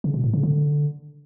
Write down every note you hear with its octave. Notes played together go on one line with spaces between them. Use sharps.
C#3
B2
A2
C#3
D3